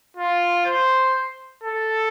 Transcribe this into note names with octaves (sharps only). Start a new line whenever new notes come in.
F4
C5
A4